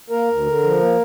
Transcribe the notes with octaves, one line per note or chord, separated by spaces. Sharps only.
A#3 A#4
D2
D3
F3
A#3